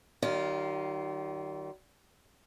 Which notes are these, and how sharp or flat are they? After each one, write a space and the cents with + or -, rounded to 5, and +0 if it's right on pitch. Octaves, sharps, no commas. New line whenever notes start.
D#3 -10 G3 -45 F4 +0